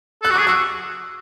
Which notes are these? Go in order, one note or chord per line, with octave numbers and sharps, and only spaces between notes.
A4 F#6
F#4
G#4 D6
F#4 E6